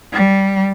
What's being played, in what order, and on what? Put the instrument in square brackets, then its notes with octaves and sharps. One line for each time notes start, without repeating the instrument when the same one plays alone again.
[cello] G3